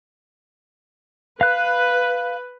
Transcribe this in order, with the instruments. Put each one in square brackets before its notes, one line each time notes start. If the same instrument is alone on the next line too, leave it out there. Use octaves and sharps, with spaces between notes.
[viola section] B4 [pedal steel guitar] F5 F#6